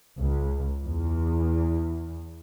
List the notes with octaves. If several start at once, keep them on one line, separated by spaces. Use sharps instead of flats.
C#2
E2